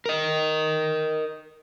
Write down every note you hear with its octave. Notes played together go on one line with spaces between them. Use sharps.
A#4 D#5